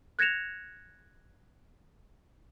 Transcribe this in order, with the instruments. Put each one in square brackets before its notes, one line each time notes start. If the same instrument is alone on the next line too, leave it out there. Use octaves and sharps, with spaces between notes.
[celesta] F#6 G#6 A#6 C#7 E7 F7